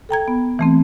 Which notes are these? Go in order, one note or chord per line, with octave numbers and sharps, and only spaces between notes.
A4 G5 A#5 G#6
B3
E3 A3 C4